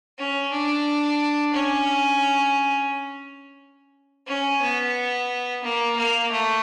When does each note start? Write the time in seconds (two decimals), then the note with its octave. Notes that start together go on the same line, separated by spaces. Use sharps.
0.18 C#4
0.52 D4
1.54 C#4
4.27 C#4
4.61 B3
5.64 A#3
5.97 A#3
6.31 A3